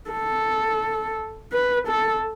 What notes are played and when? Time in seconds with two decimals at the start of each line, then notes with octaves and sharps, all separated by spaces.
0.10 A4
1.53 B4
1.88 A4